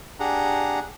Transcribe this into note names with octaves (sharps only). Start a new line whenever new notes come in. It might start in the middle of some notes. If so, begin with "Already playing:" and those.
D4 G4 G#4 F#5 A#5